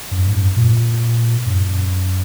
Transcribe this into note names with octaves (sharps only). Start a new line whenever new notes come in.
F#2
G#2
F#2
A#2
F#2